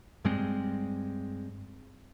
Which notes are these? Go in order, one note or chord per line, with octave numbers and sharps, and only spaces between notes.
G2 G3 G#3 C4